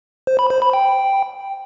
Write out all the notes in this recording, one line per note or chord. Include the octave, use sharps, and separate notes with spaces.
C5
B5
C5
B5
G5